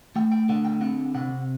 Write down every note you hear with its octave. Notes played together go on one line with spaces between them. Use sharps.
A3 G5
G5
D3 F#5
G5
C4 F#5
C3 F#5